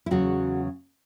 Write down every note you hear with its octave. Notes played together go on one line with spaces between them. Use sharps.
E4
E2 C#3 F#3 F#4